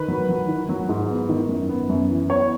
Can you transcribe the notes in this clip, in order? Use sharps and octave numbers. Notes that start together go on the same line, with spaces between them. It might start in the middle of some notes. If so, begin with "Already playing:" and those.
Already playing: D#3 B4
F#3
F#3
D#3
F#3
G#2
B3
D#3
F#2
B3
F#2
E3
B3 C#5